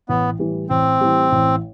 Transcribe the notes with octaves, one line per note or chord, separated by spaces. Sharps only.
A1 B3
A2 E3 G3
A1 C4
A2 E3 G3
A1